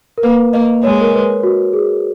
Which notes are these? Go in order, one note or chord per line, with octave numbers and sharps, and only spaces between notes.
A#4
A#3 B4
A#3 D#5
G#3 C#5
A#4
B4
F#4
G#4